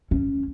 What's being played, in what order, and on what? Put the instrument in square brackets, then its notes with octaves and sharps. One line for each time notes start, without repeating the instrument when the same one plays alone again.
[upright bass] C#4